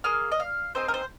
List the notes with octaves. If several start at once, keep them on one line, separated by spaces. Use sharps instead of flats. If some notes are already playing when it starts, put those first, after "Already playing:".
A#3 G#4 F6
D#5
F5
C4 D#4 G#4 C5
A#4
C5